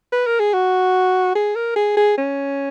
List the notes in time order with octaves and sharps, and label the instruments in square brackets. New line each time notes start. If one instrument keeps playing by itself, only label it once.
[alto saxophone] B4
A#4
G#4
F#4
G#4
A#4
G#4
G#4
C#4